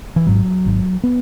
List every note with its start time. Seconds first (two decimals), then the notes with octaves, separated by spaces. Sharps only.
0.16 E3
0.26 G#1 G#2 F#3
0.65 G#1 G#2
1.04 B3